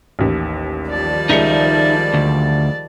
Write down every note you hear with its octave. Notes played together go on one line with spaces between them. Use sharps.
A1 D#2
D#3 F3 G3 D5 A5
C#2 D#4 G#4 E5 C#7
D2